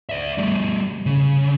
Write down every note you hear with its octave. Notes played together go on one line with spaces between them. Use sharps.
D5 E5
G3 A3
C#3